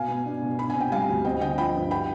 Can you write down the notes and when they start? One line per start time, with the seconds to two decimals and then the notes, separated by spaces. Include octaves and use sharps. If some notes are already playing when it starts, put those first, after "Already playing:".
Already playing: B2 F5 G#5
0.08 B3
0.26 D4
0.42 B2
0.59 D4 B5
0.70 G#5
0.75 C3
0.81 G5
0.92 G3 F5 G#5
1.09 D2
1.25 C4 D#5 G5
1.41 D3 D#5 G5
1.58 F3 G5 B5
1.75 G2
1.91 G5 B5